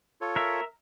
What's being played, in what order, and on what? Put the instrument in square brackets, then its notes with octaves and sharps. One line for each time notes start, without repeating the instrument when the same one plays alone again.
[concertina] F4 A4 C#5
[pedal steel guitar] A#4 E5